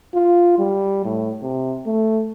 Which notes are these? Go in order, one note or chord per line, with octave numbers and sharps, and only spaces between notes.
F4
G3
A2
C3
A3